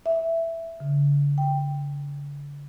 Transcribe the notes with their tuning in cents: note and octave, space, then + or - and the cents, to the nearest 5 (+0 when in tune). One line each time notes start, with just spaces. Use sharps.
E5 +5
D3 -45
G5 +5